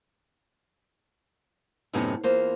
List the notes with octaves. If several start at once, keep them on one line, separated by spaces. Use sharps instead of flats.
F#2 A2 C3 B3 C#4 D#4
E2 A#3 F4 C5